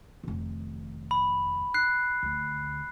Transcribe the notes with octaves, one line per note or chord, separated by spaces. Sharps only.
F1 D#3
B5
F#6 C7
D2